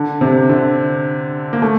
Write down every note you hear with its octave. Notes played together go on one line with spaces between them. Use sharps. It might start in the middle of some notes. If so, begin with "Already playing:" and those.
Already playing: D3
C3
D3
A#3
A3